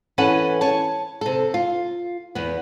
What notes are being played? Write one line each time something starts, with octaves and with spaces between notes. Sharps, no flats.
E3 C#4 A4 B4 F#5
C#5 A5
C3 A4
F4
E2 B3